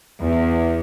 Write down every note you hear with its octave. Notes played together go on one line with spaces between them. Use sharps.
E2